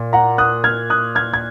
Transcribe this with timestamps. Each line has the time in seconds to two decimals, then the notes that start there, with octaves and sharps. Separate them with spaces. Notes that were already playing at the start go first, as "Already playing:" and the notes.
Already playing: A#2
0.13 F#5 A#5
0.38 D#6 F#6
0.64 F6 G#6
0.90 D#6 F#6
1.15 F6 G#6
1.34 G#6